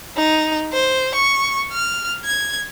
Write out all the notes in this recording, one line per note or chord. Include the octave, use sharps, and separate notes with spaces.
D#4
C5
C#6
F6
G#6